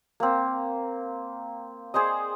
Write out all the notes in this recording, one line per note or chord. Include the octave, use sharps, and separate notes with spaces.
A#3 C4
G#4 C5 D5 D#5